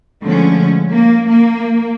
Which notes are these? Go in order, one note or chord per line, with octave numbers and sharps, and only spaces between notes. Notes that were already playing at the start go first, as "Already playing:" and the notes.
D3 F3 G#3 A3 C#4
A#3
A#3